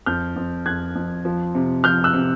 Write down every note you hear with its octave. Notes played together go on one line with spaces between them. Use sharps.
F2 F6 G6
F2
F2 F#6 G#6
F2
F3
C3
F3 F6 G6
E6 F#6
C3